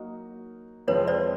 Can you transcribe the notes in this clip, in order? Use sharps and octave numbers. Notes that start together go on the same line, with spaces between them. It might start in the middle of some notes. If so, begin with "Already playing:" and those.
Already playing: F#3 A#3 D#4 F#4 A#4
F2 C3 F3 G#3 C4 B4 C#5
C5 D5